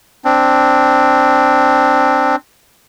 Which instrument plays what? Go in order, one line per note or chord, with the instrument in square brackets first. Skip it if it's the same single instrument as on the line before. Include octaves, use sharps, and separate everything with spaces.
[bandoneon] C4 D4